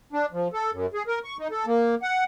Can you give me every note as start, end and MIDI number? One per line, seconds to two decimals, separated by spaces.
0.13 0.26 62
0.32 0.48 53
0.53 0.71 69
0.73 0.86 42
0.94 1.03 68
1.07 1.19 70
1.24 1.37 85
1.39 1.48 63
1.51 1.65 69
1.66 1.95 58
2.02 2.24 78